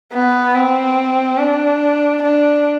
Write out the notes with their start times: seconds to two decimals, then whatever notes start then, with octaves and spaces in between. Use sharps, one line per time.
0.13 B3
0.56 C4
1.39 D4
2.23 D4